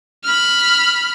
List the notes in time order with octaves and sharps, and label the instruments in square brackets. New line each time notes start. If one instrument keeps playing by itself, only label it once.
[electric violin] B5 F6